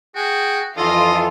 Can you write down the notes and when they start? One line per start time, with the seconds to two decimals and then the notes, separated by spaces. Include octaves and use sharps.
0.15 F#4 G#4 G5
0.77 F2 E3 F4 A4 D#5